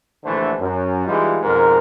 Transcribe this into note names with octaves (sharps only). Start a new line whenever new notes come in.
A#1 D3 E3 A3 A4 C5
F#2
E3 G3 G#3 D#4 F4
F2 G#2 B2 A#4